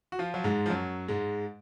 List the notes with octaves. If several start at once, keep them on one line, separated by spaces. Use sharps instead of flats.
F#4
F3 F4
F#3
G#2 G#3
F3
F#2 F#3
G#2 G#3